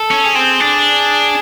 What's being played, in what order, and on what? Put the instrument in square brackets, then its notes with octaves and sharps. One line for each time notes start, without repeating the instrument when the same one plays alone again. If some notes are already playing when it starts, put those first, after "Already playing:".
Already playing: [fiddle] A4
[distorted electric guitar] C#4
[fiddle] G#4
[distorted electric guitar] C4
D4